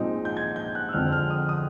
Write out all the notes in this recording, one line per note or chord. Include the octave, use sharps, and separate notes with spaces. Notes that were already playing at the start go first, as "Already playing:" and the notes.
Already playing: A#2 F3 G#3 C4 D#4
G6
G#6
G6
F#6
E6
F2 D3 F3 G#3 C4 F6
F6
D#6
D#6